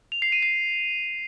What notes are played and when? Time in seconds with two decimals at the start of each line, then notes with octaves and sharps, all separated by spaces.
0.12 F7
0.22 C7
0.32 D#7
0.43 C7